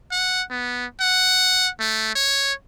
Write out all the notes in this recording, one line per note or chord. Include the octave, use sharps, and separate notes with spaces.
F#5
B3
F#5
A3
C#5